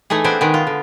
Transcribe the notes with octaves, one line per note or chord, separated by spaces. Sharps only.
E3 A3 D#4 G#4
B3 C4 D4 C5 G#5
D#3 G#3 B3
F4
D3